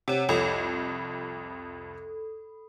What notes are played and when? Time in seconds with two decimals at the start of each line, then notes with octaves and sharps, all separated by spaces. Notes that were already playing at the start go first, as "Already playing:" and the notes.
0.08 C3 C#5 F#5
0.29 C2 F2 A4 B5 D#6